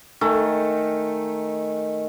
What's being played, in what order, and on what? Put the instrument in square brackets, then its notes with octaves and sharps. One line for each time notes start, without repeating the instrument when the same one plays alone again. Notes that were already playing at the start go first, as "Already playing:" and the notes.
[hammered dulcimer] D#3 A3 G#5